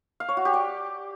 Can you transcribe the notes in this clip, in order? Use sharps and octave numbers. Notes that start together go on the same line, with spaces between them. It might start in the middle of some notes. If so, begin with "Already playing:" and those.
F5
C#5
F#4
G4
D5